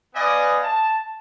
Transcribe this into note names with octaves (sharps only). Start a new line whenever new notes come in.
B3 B4 D5 D#5 F5 G#5
A5